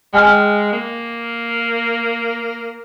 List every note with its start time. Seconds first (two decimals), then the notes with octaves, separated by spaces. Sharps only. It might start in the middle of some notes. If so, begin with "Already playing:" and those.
0.13 G#3 G5 G#5 F6
0.73 A#3